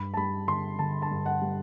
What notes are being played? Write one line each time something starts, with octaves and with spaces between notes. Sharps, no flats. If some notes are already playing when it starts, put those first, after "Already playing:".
Already playing: G2 B5
A5
G3 B5
G1 C6
D3 A5
A5
G2
F#5
G3